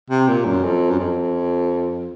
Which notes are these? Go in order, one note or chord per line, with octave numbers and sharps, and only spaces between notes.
C3
A#2
F#2
F2
F#2
F2